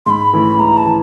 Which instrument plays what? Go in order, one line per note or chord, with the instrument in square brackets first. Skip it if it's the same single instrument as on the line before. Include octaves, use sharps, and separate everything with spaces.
[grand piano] G#2 [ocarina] B5 C6
[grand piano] E3 A3 C#4
[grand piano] G#2 [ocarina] A#5
[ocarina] A5
[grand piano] E3